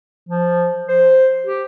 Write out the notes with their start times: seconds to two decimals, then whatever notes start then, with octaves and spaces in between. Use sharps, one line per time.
0.29 F3
0.88 C5
1.46 G4